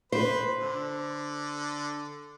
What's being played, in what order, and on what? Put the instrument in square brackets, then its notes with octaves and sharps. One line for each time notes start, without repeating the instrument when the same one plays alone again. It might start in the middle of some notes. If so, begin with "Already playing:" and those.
[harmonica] B4 [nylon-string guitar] C5
[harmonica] D3